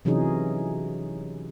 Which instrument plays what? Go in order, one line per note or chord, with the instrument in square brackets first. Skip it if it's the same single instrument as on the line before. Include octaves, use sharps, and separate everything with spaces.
[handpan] C3 E3 F#3 C#4 D#4 G#4